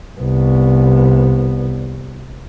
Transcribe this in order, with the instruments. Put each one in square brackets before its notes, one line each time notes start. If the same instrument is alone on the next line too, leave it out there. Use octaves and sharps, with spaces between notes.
[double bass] C2 B3